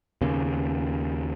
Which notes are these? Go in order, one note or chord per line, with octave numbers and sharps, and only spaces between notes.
D#2 C#3